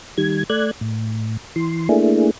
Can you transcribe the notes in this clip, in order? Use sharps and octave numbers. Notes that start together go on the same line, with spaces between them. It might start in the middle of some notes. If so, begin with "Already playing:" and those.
D#3 G3 G#6
A3 D5 F#6 G#6
A2
E3 C6
A3 A#3 D4 E4 G#4